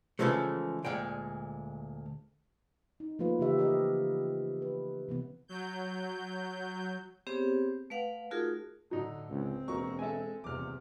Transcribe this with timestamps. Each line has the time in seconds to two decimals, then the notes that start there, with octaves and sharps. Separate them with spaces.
0.19 C#3 E3 F3 G#3 A3
0.85 D2 A#2 G#3 G5
3.00 D#4
3.19 F3 A3 A#3 F4 B4
3.39 C#3 E3 G4 E5
3.58 G4 A#4 D#5 E5
4.62 B4
5.09 C3 E3 B3
5.48 F#3 G6
7.27 B3 C4 G4 G#4 C5 C#5
7.90 A3 B4 F5 F#5
8.31 A3 D#4 F4 F#4 G#4 A#4
8.91 A2 D3 F#3 D#4
9.30 C#2 C4
9.68 E1 D#2 F#3 A#4 C#6
9.99 G#3 A4 E5 G#5
10.44 D#1 E2 C3 D6 F6